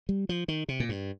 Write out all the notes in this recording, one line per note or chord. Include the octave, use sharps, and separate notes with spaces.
G3
F3
D#3
C3
A#2
G2